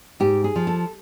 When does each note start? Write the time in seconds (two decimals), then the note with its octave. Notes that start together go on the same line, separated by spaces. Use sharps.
0.20 G#2 G4
0.44 G#4
0.56 F3
0.67 A4